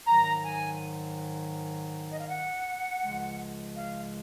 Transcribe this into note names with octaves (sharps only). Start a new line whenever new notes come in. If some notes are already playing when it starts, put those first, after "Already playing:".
G#2 D#3 F#3 A#5
G#5
D#5
F5
F#5
C#2 C#3 F3 G#3
F5